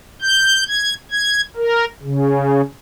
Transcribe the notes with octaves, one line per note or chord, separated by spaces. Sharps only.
G6
G#6
G#6
A#4
C#3